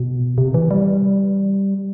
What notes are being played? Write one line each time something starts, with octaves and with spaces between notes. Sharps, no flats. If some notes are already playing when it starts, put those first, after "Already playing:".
Already playing: B2
C3
E3
G3